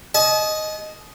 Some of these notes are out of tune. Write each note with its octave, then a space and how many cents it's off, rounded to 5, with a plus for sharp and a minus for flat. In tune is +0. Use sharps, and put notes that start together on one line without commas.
D#5 +0 A5 -45